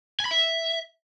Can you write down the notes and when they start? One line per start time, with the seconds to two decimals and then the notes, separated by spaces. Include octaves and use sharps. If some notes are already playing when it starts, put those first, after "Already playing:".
0.20 G#5
0.26 B5
0.31 E5